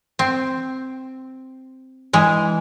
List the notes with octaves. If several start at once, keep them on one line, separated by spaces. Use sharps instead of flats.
C4
E3 G#3